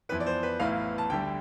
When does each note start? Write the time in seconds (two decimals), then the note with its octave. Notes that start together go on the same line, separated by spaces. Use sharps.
0.09 F2 E3 B3 B4
0.20 D5
0.26 C5
0.43 B4
0.60 A1 A2 E3 B3 F5
0.98 A5
1.10 D2 D3 G3 G5